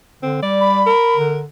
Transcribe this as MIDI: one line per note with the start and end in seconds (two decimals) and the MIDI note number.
0.23 0.41 50
0.23 0.37 60
0.42 0.90 55
0.42 0.80 74
0.61 1.16 83
0.86 1.39 70
1.17 1.43 50